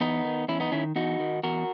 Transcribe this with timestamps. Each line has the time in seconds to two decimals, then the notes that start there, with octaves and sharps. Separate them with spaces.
0.01 E2 B3 D#4
0.25 D#3
0.48 E2 C#4 E4
0.60 B3 D#4
0.72 D#3 C#4 E4
0.96 E2 D#4 F#4
1.20 D#3
1.43 E2 F#4 A#4